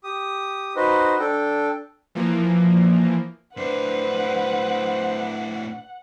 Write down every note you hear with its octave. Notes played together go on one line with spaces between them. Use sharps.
G4 D#6
D#4 F#4 B4 C5 D#5
D4 A4 G5
E3 F3 A#3
A2 D4 B4 C5 F#5